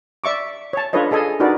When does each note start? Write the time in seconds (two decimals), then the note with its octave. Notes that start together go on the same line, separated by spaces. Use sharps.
0.24 D5 E5 C#6 D6
0.73 C#5 A5
0.93 D4 F4 A4 B4 C#5 D#5
1.11 G#4 A4 D#5 G#5
1.40 D4 D#4 F#4 A#4 B4 D5